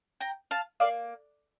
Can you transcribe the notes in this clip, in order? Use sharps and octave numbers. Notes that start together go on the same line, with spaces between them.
G5 A#5
F5 A5
A#3 D5 F5